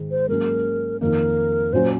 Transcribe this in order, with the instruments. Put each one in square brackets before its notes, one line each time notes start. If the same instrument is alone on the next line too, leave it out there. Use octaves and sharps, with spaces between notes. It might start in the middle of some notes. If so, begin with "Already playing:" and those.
Already playing: [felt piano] G#2 D#3 G#3
[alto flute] C5
[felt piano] G#2 F#3 A#3 C#4 [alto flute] A#4
[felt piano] F2 D#3 A#3 D#4 [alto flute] A#4
[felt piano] A#2 F#3 C#4 [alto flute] C5